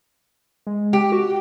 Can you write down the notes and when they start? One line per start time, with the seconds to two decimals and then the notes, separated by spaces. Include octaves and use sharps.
0.67 G#3
0.93 G4
1.12 F#4